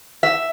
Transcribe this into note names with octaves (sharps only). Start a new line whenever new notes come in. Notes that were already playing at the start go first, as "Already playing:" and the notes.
E5